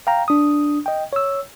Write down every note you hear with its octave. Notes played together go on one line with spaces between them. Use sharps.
F5 G5 A#5
D4 D#6
D#5 G5
C#5 E6